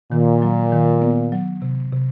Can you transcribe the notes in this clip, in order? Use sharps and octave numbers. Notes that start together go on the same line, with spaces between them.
A#2 D#3
F#3
D#3
B3
F#3
C3
C3